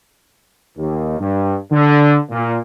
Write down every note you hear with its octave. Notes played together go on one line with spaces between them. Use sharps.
D#2
G2
D3
A#2